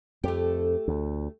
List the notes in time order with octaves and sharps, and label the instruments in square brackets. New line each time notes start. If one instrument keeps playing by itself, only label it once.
[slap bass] F2 [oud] A3 G4
[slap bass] D2